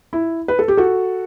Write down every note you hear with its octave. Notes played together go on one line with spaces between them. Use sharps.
E4
B4
A4
G4
F#4 A4